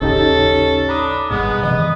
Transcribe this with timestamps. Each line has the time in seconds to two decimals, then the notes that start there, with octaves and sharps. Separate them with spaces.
0.02 A1 D#2 G#2 C#3 C#4 D#4 G4 A4
0.89 D4 A#5 B5 D#6
1.30 G#1 G2 B2 G#3 B3
1.63 C3 D#3 E3 D#5